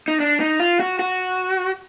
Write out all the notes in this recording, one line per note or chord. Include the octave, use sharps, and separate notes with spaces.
D#4
D4
D#4
F4
F#4
F#4